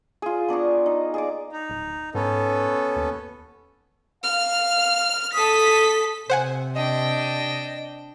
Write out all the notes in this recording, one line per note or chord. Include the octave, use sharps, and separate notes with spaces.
F4 G#4
B3 D4 A#5 C#6
D#4
G#4 D5 D6
D#4
D1
G#2 B3 C#4 A4
D#2
F5 F6
A4 A5 D#6 B6
C3 C5 F#5 G#5
D4 D#5 G5